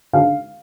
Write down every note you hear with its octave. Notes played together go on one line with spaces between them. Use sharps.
D3 F5